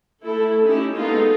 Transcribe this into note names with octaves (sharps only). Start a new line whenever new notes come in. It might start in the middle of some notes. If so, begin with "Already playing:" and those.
A3 E4 A4
C#4 D#4 E4 G4
G#3 A#3 B3 D#4 F4 A4